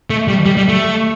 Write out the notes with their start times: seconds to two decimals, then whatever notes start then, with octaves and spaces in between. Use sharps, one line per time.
0.10 A3
0.28 G3
0.46 G3
0.57 G3
0.69 A3